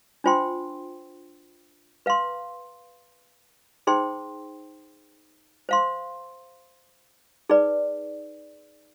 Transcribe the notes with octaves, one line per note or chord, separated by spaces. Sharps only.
D4 F4 C5 G5 C6
B4 F5 C6
D#4 G#4 C5 G5 C6
C5 F5 C6
D#4 G#4 B4 D5